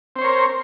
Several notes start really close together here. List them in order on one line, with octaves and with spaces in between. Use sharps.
C4 C5 C#5 A#4